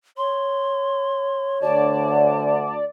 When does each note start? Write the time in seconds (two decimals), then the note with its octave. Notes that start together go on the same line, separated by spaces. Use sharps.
0.17 C#5 C6
1.62 D2 D3 D5 A5